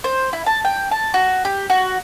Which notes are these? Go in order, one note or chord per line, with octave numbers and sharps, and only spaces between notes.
C5
E4
A5
G5
A5
F#4
G4
F#4